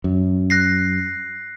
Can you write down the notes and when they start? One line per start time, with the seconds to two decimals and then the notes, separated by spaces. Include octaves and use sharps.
0.04 F#2
0.50 F#6 A#6 C7